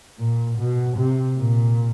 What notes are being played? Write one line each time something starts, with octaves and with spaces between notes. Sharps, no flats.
A#2
B2
C3
A#2